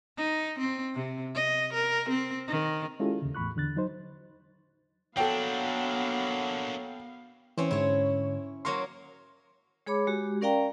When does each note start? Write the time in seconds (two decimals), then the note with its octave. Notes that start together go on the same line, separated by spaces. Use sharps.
0.17 D#4
0.59 C4
0.95 C3
1.35 D#5
1.73 A#4
2.09 C4
2.47 D#3
3.00 G#3 C#4 E4 F4 G4 A4
3.22 D#2 C#3
3.35 E2 A2 B5 C#6 F#6
3.56 E2 D3 F#6 A6
3.76 F#3 D#4 C5
5.17 F#3 A#3 B3 D4 A4 F5 G5
7.58 E3 C4 C#4
7.71 G#2 D3 E4 C#5
8.65 F#3 A#3 A#4 C6 C#6
9.86 G#3 G#4 C#5 B5 D6
10.07 G#3 F#4 G4
10.41 C#4 A#4 D5 F5 G5 A#5